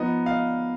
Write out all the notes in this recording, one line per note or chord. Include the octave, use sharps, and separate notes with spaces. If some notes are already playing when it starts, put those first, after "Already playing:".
Already playing: F3 B3 D#4 D#5
F5
D#5